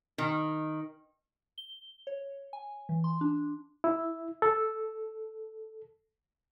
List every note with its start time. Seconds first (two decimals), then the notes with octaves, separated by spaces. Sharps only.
0.18 D#3
1.58 G7
2.07 C#5
2.53 G#5
2.89 E3
3.04 C6
3.21 D4
3.84 E4
4.42 A4